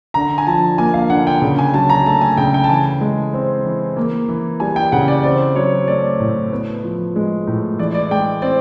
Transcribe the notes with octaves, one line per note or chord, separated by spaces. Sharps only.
D3 A#5
G#5
F3 A5
A#3 G#5
F5
D3 F#5
G5
C#3
G#5
F#3 A5
A#5
A3 A5
G#5
C#3 G5
G5
A5
E3 G#5
G#3
C4
E3
A#3
E3
G3 G#5
G5
C#3 F#5
D5
C4 D5
F#3 C#5
A3 D5
A2
B3
F3
G#3
A2
E3 D5
D5
G#3 G5
C4 D5